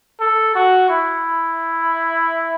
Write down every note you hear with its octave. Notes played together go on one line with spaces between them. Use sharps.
A4
F#4
E4